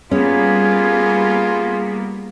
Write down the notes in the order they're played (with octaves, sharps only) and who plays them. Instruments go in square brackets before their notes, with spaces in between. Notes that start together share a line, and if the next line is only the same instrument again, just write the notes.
[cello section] G3 A#3 B3 [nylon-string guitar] C#4 [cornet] F4 [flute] G#4